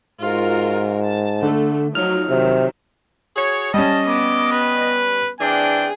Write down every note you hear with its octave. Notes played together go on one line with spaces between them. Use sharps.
G#2 F4 F#4 A#4
A5
D3 A3 A4
F3 F#3 D#4 F6
C3 D#3 F#3
F#4 G#4 C#5
G3 C#4 D#5 A5
B3 D6
B4
E3 C4 D4 G#4 G5